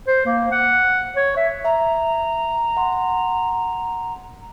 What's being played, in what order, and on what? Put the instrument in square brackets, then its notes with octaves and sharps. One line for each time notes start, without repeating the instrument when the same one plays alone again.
[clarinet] C5
A#3
F#5
C#5
E5
[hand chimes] E5 [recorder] A#5
[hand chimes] F#5 C6